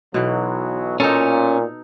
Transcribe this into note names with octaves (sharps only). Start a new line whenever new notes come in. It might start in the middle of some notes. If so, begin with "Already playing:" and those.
B1 B2 E3 F#3
A#2 C#4 D#4 A4